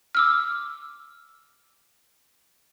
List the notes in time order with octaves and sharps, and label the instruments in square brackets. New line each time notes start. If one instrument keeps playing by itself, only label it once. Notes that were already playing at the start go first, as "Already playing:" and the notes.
[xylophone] D6 E6 F6